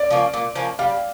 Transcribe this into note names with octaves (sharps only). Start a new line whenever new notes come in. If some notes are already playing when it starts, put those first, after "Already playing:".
Already playing: D5
F3 A#3 C#4
A#2
F3 A#3 C#4
G3 F5